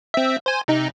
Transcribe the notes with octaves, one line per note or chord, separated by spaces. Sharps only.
C4 E5
C5 G#5
C3 D#4